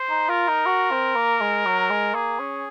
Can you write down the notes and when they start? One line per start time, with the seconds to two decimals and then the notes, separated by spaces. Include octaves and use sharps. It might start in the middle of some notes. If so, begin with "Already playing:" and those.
Already playing: C5
0.10 D#4
0.29 F4 A#4
0.48 D#4
0.66 F#4
0.91 C4
1.15 A#3
1.40 G#3
1.65 F#3
1.90 G#3
2.14 A#3 G#4
2.40 C#4